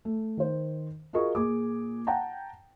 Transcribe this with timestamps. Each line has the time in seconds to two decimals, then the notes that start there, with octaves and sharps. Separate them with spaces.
0.05 A3
0.37 D#3 C5
1.13 F4 F#4 G#4 A#4 D#5 C#6
1.35 A#2 G#4 D6
2.07 F#5 G5 A5 A#5